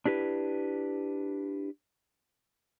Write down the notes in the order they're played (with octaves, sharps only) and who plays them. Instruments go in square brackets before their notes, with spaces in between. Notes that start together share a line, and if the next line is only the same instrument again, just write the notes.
[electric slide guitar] D4 E4 G4 B4